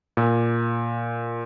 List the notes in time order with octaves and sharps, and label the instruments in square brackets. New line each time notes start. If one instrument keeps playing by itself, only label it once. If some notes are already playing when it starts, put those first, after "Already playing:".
[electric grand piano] A#2